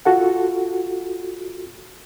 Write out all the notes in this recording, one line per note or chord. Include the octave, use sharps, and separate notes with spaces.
F4 F#4 A4 F#5